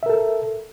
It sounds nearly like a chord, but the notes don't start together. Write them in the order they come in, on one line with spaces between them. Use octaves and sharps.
E5 A#4 A4